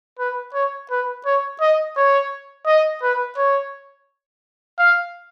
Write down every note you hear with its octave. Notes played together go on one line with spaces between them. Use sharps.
B4
C#5
B4
C#5
D#5
C#5
D#5
B4
C#5
F5